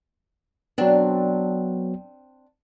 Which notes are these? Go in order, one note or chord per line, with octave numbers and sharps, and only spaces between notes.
F#3 B3 C4 D4